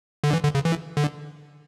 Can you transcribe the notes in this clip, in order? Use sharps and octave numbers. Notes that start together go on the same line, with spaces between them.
D3
E3
D3
C#3
E3
D3